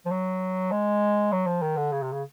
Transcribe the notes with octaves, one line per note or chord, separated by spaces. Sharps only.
F3
F#3
G#3
F#3
F3
D#3
D3
C#3
C3
C#3